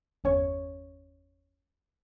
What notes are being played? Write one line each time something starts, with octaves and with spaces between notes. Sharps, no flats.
G1 E2 C#4 C#5 C#6